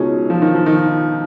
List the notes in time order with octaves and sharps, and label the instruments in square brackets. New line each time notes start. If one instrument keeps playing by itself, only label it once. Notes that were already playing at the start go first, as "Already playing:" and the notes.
Already playing: [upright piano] C#2 B2 G#3 D#4 [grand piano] C#4
[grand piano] F3
D#3
F3
D#3